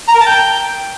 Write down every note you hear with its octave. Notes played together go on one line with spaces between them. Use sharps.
A#5
A#4
A5
G5